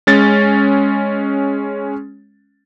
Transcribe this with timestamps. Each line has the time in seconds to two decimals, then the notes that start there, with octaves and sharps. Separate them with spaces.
0.07 G#3 C#4 A6